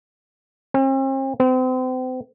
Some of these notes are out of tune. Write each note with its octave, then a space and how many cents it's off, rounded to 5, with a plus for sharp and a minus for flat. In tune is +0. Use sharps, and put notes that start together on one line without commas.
C4 +45
C4 -35